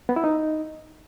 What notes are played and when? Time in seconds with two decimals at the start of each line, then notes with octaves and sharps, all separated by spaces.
0.09 B3
0.16 E4
0.24 D#4